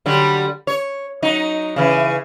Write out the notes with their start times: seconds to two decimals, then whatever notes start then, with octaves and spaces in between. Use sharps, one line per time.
0.06 D3 F#3 G3
0.67 C#5
1.22 F#3 D#4
1.76 C#3 E3